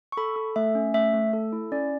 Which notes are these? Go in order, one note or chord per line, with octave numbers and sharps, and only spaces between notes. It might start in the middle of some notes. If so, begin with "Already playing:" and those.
C#6
A4 B5
A4
A3 E5
C#4
A3 E5
A3
A4
E4
C#4 D5